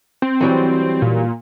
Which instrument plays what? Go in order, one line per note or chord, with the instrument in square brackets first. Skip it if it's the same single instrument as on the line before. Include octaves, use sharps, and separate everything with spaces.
[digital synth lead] C4
[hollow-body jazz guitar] E3 F#3 G3
[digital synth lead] A#2